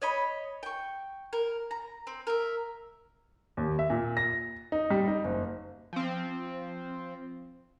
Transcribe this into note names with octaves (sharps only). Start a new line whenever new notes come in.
C#5 D#5 B5
G5 C#6
A#4
A#5
C4
A#4 E5
D#2
E5
A#2
A#6
D#4
G3
D#4
F#1
F3 C4